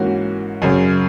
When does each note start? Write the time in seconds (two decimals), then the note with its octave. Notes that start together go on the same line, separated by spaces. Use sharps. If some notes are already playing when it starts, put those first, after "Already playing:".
Already playing: G#2 E3 A#3 C#4 F#4
0.62 F#2 C#3 F#3